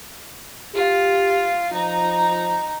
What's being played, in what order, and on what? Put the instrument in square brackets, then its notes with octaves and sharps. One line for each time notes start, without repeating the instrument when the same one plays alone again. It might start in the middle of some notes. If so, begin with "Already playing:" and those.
[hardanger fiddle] F4 [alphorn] G4
[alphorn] F3 [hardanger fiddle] D#4 A#5